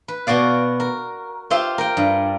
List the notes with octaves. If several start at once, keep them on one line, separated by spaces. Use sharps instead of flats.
B4
B2 B3 F#4 D5 F5
A#4
F4 G4 C5 E5 F5
A#4 G5
G2